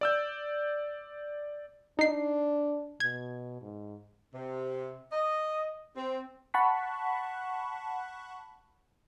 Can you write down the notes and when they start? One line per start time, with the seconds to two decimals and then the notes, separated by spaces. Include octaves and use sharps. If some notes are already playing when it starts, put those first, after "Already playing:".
0.01 D5 E6 G6
1.99 D4 D#4 C7
3.00 B2 G#6
3.62 G#2
4.34 C3
5.12 D#5
5.96 C4
6.54 F#5 A5 B5 C#6 F#6 B6